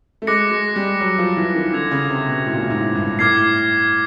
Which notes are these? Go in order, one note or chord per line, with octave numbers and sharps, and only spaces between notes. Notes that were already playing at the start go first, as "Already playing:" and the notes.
A3
G#3 D6 F#6 A#6 C#7
G#3
G3
F#3
F3
E3
D#3
D3 E6 G#6 C#7 F7
C#3
C3
B2
A2
A#2
A2
G#2
G2
A2 D6 F6 G#6 C7